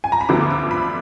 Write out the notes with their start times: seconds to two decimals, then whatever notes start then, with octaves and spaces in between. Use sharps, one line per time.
0.04 G#5
0.12 A#5
0.21 B5
0.29 D2 D3 F3 B3 D6
0.50 D6
0.71 B5